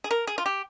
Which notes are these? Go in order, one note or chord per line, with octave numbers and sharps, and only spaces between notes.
G#4
A#4
G#4
F4
G4